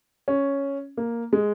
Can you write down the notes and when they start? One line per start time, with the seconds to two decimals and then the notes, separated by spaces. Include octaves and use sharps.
0.28 C#4
0.97 A#3
1.33 G#3